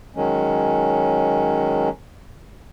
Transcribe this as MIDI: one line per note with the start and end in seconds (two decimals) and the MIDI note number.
0.16 1.89 51
0.16 1.89 54
0.16 1.89 56
0.16 1.89 61